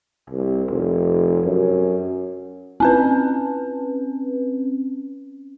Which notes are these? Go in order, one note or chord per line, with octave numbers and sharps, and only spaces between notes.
C2
F1
F#2
C4 C#4 B4